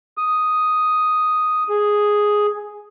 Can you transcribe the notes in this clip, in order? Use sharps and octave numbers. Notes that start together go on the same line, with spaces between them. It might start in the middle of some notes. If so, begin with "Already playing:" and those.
D#6
G#4